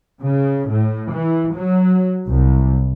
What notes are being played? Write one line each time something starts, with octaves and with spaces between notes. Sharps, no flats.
C#3
A2
E3
F#3
C2